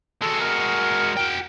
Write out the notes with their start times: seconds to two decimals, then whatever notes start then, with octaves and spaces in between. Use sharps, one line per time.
0.22 G#3 F#4 A4
0.41 A#4
1.17 F#4 G5